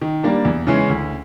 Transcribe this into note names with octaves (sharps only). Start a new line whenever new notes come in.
D#3
G3 A#3 D4
E2
C#3 E3 G#3 C#4
D2